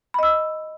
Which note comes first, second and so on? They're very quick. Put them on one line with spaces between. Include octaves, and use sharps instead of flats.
B5 D#5 E6